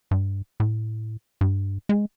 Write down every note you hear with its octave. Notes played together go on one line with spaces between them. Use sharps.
G2
A2
G2
G#3